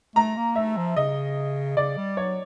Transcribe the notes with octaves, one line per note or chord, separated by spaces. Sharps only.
A3 A#5
A#3
A3 E5
F3
C#3 D#5
C#3 D5
G3
F#3 C#5